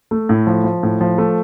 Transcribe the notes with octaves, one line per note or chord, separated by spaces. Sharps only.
A3
A2
F3
F3
A2
F3
A3